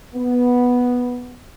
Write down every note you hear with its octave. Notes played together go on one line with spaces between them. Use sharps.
B3